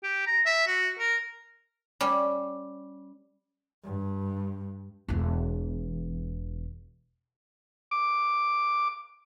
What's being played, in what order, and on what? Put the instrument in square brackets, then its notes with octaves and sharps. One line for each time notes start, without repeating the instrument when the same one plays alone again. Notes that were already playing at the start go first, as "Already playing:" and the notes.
[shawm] G4
A#5
E5
F#4
A#4
[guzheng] G3 C#4
[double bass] G2
[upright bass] E1 E2
[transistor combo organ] D6